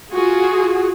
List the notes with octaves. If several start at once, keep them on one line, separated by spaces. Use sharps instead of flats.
F4 F#4 G#4